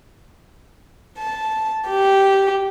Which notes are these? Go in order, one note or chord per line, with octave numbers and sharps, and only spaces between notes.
A5
G4